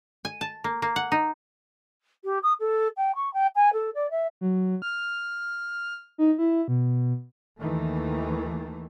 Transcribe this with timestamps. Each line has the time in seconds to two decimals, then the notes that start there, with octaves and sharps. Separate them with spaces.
0.25 G#5
0.41 A5
0.64 A#3
0.82 A#3
0.96 F#5
1.12 D#4
2.24 G4
2.43 D#6
2.60 A4
2.97 G5
3.15 C#6
3.33 G5
3.55 G#5
3.73 A4
3.95 D5
4.10 E5
4.41 F#3
4.82 F6
6.18 D#4
6.38 E4
6.68 B2
7.58 D#2 D#3 E3 A3